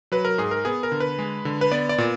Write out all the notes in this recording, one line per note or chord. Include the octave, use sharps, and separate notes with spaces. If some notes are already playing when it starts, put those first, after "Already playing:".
F#3 B4
A#4
G#2 G#4
A#4
B3 G#4
A#4
D3
B4
G#3
D3
B4
B3 D5
D5
A#2